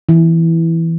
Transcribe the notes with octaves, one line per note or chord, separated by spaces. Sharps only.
E3